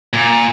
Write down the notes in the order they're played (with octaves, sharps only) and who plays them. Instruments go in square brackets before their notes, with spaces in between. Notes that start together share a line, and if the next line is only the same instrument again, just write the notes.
[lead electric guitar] A#2